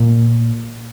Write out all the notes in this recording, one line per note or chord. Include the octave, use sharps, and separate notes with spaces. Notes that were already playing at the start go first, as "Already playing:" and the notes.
Already playing: A#2